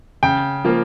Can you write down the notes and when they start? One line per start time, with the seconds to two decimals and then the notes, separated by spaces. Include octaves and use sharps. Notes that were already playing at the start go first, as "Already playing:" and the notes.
0.23 C#3 G5
0.65 F3 A#3